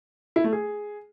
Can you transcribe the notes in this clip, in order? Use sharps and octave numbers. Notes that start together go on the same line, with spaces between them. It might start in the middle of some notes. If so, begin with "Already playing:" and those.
E4
A3
G#4